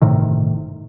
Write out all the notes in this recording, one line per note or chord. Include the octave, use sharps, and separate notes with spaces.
G1 A2 C3 D#3